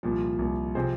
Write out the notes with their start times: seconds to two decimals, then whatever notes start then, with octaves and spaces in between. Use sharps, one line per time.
0.03 C2 A#2 F3
0.39 C2 A#2 F3
0.75 C3 F3 C4 G#4 C5